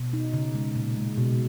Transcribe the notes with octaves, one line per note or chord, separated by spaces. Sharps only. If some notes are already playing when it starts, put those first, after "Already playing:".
Already playing: B2
D#4
C#3
G#3
A#2
G#3
B2